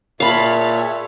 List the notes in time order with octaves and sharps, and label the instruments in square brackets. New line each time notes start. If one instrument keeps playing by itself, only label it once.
[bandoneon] A#2 [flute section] G#4 E5 [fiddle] C#5 A5 [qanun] F5 B5